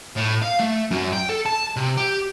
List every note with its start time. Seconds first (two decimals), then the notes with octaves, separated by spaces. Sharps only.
0.16 A2
0.42 F5
0.59 A3
0.91 F#2
1.13 G5
1.29 A4
1.46 A5
1.76 C3
1.97 G4